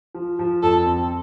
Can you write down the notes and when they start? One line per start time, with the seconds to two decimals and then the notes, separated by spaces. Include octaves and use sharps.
0.15 F3
0.39 F3
0.62 F2 A4
0.87 C4